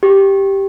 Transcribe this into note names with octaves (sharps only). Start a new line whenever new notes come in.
G4